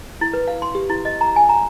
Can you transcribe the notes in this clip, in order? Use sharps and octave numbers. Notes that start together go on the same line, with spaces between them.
E4
B4
F5
C6
G4
E4
D#5
A#5
G#5
A#5